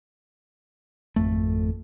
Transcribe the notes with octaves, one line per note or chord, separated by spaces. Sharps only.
G#1 F2 A3